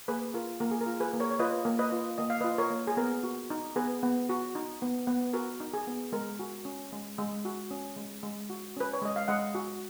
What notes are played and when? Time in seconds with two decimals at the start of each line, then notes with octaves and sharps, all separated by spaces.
0.08 A#3 G#4 B4
0.34 F4 A#4
0.60 A#3 A#4
0.71 G#4
0.81 A#4
0.86 F4
1.00 G#4 B4
1.13 A#3
1.20 A#4 C#5
1.31 C#5
1.39 F4 B4 D#5
1.65 A#3
1.79 B4 D#5
1.92 F4
2.18 A#3 D#5
2.30 F5
2.41 B4 D#5
2.44 F4
2.58 A#4 C#5
2.70 A#3
2.87 G#4
2.97 B3 A#4
3.23 F#4
3.50 D#4
3.76 B3 G#4 B4
4.03 B3
4.29 F#4
4.55 D#4
4.82 B3
5.07 B3
5.33 F#4 A#4
5.60 D#4
5.74 G#4
5.87 B3
6.12 G#3 A#4
6.39 F#4
6.65 C#4
6.92 G#3
7.19 G#3
7.45 F#4
7.71 C#4
7.96 G#3
8.23 G#3
8.50 F#4
8.76 C#4 B4
8.93 C#5
9.02 G#3 D#5
9.16 F5
9.28 G#3 D#5 F#5
9.55 F#4